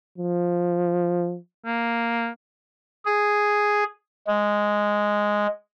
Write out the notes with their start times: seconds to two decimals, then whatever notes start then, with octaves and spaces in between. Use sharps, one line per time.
0.18 F3
1.66 A#3
3.05 G#4
4.27 G#3